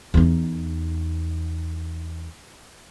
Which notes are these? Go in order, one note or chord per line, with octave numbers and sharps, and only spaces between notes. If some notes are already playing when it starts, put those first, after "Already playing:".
E2 D#4